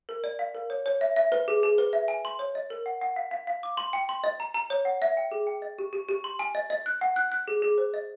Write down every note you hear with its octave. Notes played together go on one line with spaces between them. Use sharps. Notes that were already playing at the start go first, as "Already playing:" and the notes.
A#4
D5
F5
A#4
C#5
C#5
E5
E5
B4
G#4
G#4
B4
E5
G#5
C6
C#5
D#5
A#4
F#5
F#5
F5
F5
F5
D6
C6
G5
C6
D#5
A#5
A#5
C#5
F#5
E5
G5
G#4
G5
D#5
G4
G4
G4
C6
G#5
D#5
D#5
F#6
F#5
F#6
F#6
G#4
G#4
C5
D#5